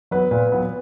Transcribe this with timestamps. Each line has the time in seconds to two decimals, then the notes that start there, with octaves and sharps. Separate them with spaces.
0.11 F#3 B3 B4
0.31 A#2 B4
0.52 F#3 B3